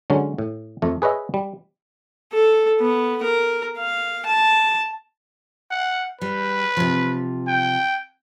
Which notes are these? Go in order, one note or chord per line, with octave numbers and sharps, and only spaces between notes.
D3 F#3 G#3 C#4
A2
F2 A3
G#4 B4 C#5 D#5 E5
G3
A4
B3
A#4
F5
A5
F#5
G3 B4
C3 F3
G5